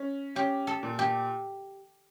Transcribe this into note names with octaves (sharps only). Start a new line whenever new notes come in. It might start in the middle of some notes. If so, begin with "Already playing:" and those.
Already playing: C#4
C#4 G4
A4
A#2
G4